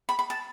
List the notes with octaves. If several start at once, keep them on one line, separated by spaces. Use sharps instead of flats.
B5
B5
A5